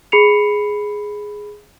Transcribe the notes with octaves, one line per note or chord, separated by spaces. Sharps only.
G#4 B5 C7 C#7 F7